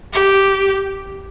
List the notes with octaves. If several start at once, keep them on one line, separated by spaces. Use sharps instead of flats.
G4